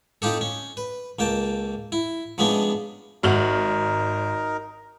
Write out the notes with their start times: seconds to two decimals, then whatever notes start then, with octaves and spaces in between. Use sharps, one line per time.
0.22 C4 D#4 F4 G4 A4
0.41 C#4
0.77 B4
1.19 C#2 A#3 G5 A5
1.92 E4
2.38 C3 F3 G#3 B3 C#4 D4
3.23 G#1 D#4 F#4 A#4 E5 F#5 F6 F#7